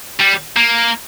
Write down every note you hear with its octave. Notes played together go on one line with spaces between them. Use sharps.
G3
A#3